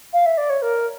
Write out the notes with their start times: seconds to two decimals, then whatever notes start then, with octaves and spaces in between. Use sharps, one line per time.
0.13 F5
0.26 E5
0.37 D5
0.50 C#5
0.62 A#4